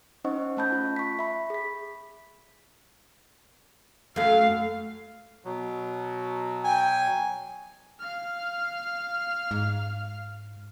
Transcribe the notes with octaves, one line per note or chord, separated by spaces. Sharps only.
C#4 D#4 C5 D#5 F#5 C#6
A3 C#4 A5 B5 G6
F4
C#6 B6
E5 B5
G#4 B6
F#2 A3 F5
B2 F#3
G5 G#5
F5 F6
G#2